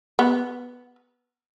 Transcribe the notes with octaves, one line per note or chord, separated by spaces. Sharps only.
B3